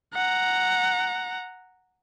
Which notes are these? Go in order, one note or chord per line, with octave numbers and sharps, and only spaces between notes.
F#5 A#5